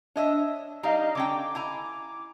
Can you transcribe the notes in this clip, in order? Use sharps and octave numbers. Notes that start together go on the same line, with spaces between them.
D4 C#5 D#5 E5
G3 D#4 D#5 F5 A#5
D3 C#4 G5 D6
E4 G#5 A#5